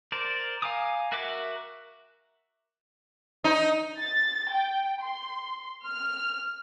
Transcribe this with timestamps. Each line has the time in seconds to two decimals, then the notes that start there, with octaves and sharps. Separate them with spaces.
0.12 A#4 C5 D5
0.62 F5 G#5 A#5 D6 D#6
1.12 F#4 A#4 E5 F#5 D6
3.44 D#4
3.99 A6
4.52 G5
5.01 C6
5.86 F6